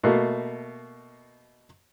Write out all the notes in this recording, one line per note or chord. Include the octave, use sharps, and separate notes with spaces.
B2 A3 A#3